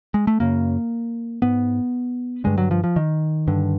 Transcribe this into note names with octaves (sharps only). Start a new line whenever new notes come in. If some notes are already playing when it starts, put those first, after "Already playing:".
G#3
A3
F#2 C#3 A#3
G#2 B3
G2 D3 G#3
F#3
F3
F3
D#3
G2 D3